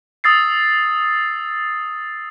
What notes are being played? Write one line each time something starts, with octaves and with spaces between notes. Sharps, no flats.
D#6 E6 A6 C7